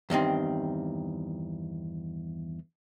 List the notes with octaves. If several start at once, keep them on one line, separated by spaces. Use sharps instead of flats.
E2 G2 D#3 C4